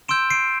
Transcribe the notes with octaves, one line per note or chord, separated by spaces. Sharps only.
C6 E6 G6 D7 E7
C7 D7